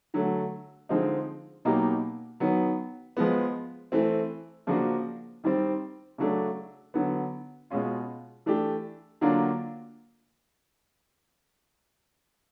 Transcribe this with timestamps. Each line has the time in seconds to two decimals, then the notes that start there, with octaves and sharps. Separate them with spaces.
0.14 D3 F#3 A3
0.89 D3 F3 G#3 C4 D#4
1.65 B2 F#3 A#3 D#4 G4
2.40 D#3 F#3 B3
3.17 F3 G#3 B3
3.92 E3 A3 C4
4.67 C#3 F3 A#3 D4 F#4
5.44 D#3 G3 C4
6.18 C#3 F#3 A3 D4
6.94 D3 F#3 B3
7.70 B2 G#3 C#4 F4
8.46 E3 A3 D4 G4
9.21 D3 F#3 A#3 D4 F4